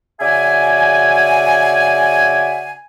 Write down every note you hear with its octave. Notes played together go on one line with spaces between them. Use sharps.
C#3 F#4 D5 E5 G#5